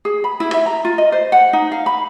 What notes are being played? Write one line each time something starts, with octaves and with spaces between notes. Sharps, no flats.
G#4
B5
E4
E5
A#5
F4
D#5
C5
F#5
D#4
F5
B5